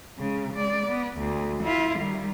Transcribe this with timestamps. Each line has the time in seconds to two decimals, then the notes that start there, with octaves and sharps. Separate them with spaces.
0.18 C#3 G#3
0.54 G#3 D5
0.87 B3
1.18 D2
1.64 E4 F4
1.99 D#3 G3